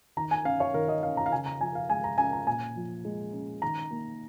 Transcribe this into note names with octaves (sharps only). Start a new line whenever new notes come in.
D#3 A#5
G#5
C#4 F5
C#5
D#3 A#4
D#5
C#4 F5
A#5
F5
C#3 G#5
A#5
F3 G#5
F5
G#3 G#5
A#5
C#4 G#5
A#5
A#2 G#5
F3
G#3
C#4
D#3 A#5
A#3